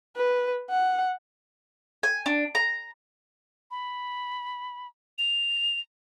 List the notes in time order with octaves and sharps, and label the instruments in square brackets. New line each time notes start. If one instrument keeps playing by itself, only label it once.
[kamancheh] B4
F#5
[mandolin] G#5
D4
A#5
[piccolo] B5
F7